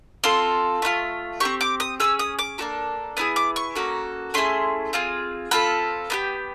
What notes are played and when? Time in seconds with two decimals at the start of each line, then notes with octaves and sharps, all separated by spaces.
0.24 C4 F4 A4 C6
0.82 A3 D4 F4
1.40 C4 E4 G4 C#6
1.61 D6
1.80 D#6
2.00 C#4 F4 G#4 E6
2.19 D#6
2.39 D6
2.58 A#3 D4 F#4 A4
3.17 B3 E4 G#4 D#6
3.36 D6
3.56 C#6
3.75 A#3 C#4 F#4 A4
4.34 A3 C#4 E4 G#4 C6
4.93 C4 F4 G#4
5.51 C4 F4 A4 B5
6.10 B3 D#4 G4